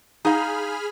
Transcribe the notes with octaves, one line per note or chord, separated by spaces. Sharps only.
D#4 G#4 F5 B5 F6